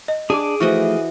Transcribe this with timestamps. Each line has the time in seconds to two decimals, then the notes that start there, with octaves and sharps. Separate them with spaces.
0.08 D#5
0.30 D4 G#4 G#5 D6
0.60 E3 F3 A3 F#4 C5 D#5 C#6